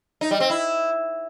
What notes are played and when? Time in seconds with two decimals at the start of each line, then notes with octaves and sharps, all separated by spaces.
0.21 D#4
0.31 G3
0.40 C4
0.50 E4